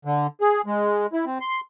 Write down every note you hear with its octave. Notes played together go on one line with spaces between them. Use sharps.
D3
G#4
G#3
E4
C4
C6